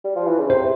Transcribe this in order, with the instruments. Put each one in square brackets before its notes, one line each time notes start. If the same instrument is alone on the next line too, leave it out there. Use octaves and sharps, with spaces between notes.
[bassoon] G3
F3
E3
C#3
[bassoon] C3 [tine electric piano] C5